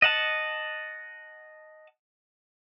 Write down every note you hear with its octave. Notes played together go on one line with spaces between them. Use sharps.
D#5 F#5 A5